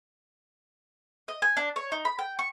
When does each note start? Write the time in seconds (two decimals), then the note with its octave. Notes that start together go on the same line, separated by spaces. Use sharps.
1.28 D#5
1.42 G#5
1.57 D4
1.76 C#5
1.92 D#4
2.05 B5
2.19 G5
2.39 C#6